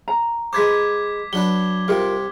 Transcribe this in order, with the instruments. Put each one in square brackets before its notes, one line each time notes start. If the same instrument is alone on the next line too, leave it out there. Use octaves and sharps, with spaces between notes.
[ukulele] A#5
[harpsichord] G#3 B4 C5 [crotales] D6 G#6 B6
[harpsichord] F#3 D4 B4 [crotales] G7
[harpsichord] C2 C3 C4 [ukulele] F4 A#4